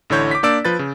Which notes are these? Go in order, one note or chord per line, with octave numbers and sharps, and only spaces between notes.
A1 D3 E4 C#5 G6
D6 B6
A#3 D4 D5 E6 D7
F3 B4 A6
C#3